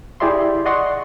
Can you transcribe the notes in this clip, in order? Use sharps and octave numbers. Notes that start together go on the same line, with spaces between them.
E4 G4 G#4 D5 E5 C6
D5 D#5 F#5 C6 C#6